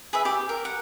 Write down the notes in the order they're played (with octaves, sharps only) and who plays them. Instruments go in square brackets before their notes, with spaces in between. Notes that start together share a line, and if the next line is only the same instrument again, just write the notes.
[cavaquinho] G#4 B4 E5
G4
A#4
F#5